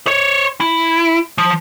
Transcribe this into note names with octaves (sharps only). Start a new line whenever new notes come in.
C5 C#5
E4
F3